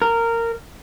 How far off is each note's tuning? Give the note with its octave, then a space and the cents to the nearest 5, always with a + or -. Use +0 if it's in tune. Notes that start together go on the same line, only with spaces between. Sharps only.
A#4 -15